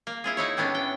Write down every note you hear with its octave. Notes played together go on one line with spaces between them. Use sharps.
A#3
E4 F4 G#4
D#4 E4 C#5
A2 G3 B3 C#4 D4
G5